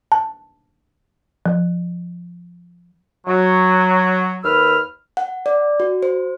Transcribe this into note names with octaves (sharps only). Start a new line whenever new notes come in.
A5
F3
F#3
D#2 B4 E6 F6
F#5
D5
F#4
C5